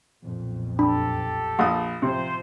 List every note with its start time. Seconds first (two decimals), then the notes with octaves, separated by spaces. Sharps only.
0.23 B1 F2 A#2
0.79 D4 G4 A4 B5
1.59 A#1 F#5 D#6
2.02 A1 C3 F3 C5